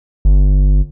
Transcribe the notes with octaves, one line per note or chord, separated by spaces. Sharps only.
G1